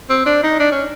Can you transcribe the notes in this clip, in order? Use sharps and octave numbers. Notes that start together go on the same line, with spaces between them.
C4
D4
D#4
D4
C#4